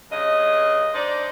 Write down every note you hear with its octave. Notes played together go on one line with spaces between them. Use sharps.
G2 C#3 D#5
D4 D#4 C5 D5